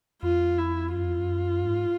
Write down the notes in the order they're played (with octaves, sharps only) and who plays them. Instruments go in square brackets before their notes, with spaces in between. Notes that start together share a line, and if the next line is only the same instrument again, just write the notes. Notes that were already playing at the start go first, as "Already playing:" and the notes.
[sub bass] F2 [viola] F4
[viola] E4
[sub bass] F#2 [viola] F4
[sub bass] F2
F#2
G2
G#2